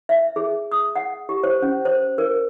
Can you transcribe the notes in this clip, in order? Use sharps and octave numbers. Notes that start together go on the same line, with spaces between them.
E5
G#4
D#6
F#5
G4
C5
C#4
C5
A#4